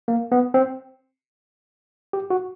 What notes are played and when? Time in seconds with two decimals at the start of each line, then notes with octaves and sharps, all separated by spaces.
0.08 A#3
0.32 B3
0.54 C4
2.13 G4
2.30 F#4